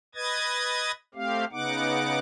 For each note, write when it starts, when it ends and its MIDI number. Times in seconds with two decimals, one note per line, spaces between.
0.15 0.91 71
0.15 0.91 75
0.15 0.91 87
0.15 0.91 92
0.15 0.91 93
1.15 1.45 57
1.15 1.45 60
1.15 1.45 67
1.15 1.45 77
1.52 2.19 49
1.52 2.19 59
1.52 2.19 63
1.52 2.19 78
1.52 2.19 86